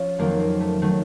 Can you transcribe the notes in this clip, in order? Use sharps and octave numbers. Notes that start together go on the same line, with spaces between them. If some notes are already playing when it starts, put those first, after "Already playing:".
Already playing: F3 C#4 F4
F2 D#3 F#3 A#3
A#3
A3
D#3 F#3 A3